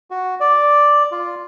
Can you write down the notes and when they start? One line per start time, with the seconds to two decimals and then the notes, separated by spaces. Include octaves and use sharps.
0.11 F#4
0.40 D5
1.12 F4